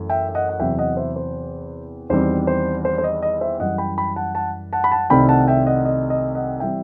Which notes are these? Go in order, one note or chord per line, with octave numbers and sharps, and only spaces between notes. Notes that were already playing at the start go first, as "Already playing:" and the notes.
Already playing: F#2 E3 A3
E5 G5
E5
D#5 F#5
F#5
E2 C3 F#3 C4 E5 G5
D#5 F#5
C5 E5
C5
E2 D#3 G3 C4 C5
C5
C5
C5
D#5
D#5
C5 E5
F#2 E3 G3 D#5 F#5
G5 B5
G5 B5
F#5 A5
F#5 A5
F#5 A5
B5
F#5 A5
C2 C3 D#3 A3 C4 G5 B5
F#5 A5
E5 G5
D#5 F#5
D#5
D#5
D#5 F#5
E3 G3 C4 E5 G5